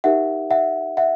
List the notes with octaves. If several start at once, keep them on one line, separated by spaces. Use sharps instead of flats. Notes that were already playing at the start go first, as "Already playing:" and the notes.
D#4 G4 A#4 E5 F#5
E5 F#5
E5 F#5